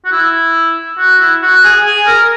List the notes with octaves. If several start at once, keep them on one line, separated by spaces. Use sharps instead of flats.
F#4
E4
F#4
E4
F#4
G#4
G#4
A#4